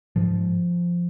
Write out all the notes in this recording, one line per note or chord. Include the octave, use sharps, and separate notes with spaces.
G#2 F3